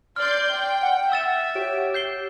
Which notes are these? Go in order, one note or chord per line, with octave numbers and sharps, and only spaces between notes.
D5 C6 F6 G6
G5
F#5
E5 E6 A6 E7
G4 C#5 D7
G6 C7 G7